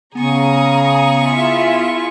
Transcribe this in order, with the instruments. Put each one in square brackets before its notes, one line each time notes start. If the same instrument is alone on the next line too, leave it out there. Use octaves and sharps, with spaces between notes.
[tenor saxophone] C#3 [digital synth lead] B3 [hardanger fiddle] G#4 C#6 [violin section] A#5 D#6
[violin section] E4 F4 E5